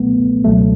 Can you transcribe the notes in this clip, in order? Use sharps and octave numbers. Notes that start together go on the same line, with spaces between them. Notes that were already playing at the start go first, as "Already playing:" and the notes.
Already playing: C#2 B2 F#3 A3 B3
C#2 B2 F#3 A3